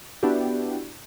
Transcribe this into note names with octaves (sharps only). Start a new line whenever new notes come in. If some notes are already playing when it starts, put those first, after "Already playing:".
B3 D4 E4 F#4 G4